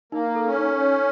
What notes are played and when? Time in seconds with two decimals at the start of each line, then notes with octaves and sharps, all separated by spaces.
0.12 A#3 D#4
0.35 A4
0.47 C#4
0.58 D#4
0.81 C#5